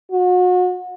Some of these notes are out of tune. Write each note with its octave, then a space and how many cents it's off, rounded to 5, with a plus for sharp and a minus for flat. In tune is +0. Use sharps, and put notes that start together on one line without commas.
F#4 -35